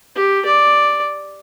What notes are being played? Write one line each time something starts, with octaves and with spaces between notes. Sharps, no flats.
G4
D5